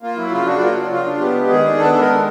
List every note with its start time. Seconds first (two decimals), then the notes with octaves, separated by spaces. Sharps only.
0.02 A#3 F4
0.17 F#3 E4
0.32 C#3 F4
0.46 D4 F#4
0.61 A#3 F4
0.76 F#3
0.91 C#3 F4
1.06 D4
1.21 B3 G4
1.35 G#3
1.50 D#3 G#4
1.66 D4
1.80 B3 A4
1.95 G#3
2.00 A#4
2.10 D#3